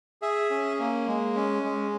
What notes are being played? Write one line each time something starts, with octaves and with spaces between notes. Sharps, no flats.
G#4 E5
C#4
A#3
G#3
C#4
G#3